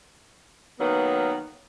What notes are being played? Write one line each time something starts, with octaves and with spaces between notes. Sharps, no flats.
D#3 F#3 A#3 B3